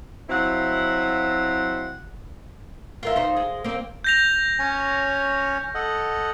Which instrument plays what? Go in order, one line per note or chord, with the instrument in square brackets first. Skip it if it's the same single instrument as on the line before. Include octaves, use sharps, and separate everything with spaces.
[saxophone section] F#3 C4 E4 F5 F#5
[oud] F4 A#4 E5
D#4 F4 C5
G#3
A#3 C4
[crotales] G6 A#6 F7
[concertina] C#4 C#5 G#5
A4 D#5 F#5